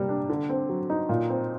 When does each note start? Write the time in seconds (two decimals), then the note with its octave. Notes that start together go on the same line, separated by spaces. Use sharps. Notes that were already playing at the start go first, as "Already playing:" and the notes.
Already playing: C3 G3 A#3
0.09 D4
0.29 D3
0.49 C4
0.69 F#3
0.90 D#4
1.09 A#2
1.29 C4